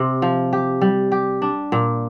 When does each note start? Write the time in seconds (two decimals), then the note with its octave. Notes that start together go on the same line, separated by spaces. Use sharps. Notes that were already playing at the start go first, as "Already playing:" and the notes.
Already playing: C3 C4
0.22 F3
0.53 G4
0.81 G3
1.12 G4
1.42 D4
1.72 A#2